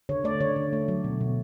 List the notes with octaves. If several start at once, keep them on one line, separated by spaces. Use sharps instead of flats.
D3 C#5
A3 D5
D3 C#5
D3
A3
F#3
B2
B2